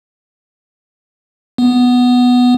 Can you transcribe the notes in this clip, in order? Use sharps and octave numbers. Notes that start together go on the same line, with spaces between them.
B3